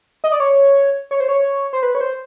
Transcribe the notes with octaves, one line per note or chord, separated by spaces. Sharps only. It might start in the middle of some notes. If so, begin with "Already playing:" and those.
D#5
D5
C#5
C#5
C5
C#5
C5
B4
C#5
C5